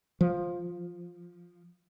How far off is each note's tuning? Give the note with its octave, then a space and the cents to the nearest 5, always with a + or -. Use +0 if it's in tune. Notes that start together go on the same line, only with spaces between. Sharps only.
F3 +5